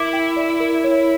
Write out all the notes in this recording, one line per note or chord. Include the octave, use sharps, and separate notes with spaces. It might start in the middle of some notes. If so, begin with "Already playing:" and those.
Already playing: E4 A#4 D6
G5
D5
A#4
C#5